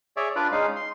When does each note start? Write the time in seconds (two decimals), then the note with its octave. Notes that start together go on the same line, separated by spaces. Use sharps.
0.17 G#4 C#5 D5 E5
0.36 D4 F4 B4 D5
0.52 G#3 C#4 D#4 F5
0.76 C6